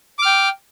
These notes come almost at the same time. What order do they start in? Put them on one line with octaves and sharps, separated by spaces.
D6 F6 G5